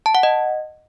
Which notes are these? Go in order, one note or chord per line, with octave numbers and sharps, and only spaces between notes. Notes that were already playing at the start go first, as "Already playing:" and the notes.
A5
F#5
D#5